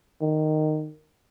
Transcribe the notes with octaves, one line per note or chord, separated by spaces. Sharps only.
D#3